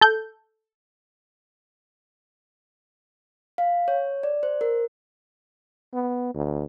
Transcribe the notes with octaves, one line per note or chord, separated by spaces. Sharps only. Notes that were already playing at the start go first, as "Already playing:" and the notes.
A4 G6
F5
C#5
D5
C5
A#4
B3
D2